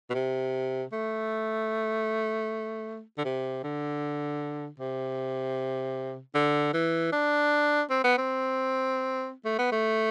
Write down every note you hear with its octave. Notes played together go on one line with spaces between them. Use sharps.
B2
C3
A3
D3
C3
D3
C3
D3
E3
D4
C4
B3
C4
A3
B3
A3